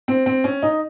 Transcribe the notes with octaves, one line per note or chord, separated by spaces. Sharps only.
C4
C4
C#4
D#4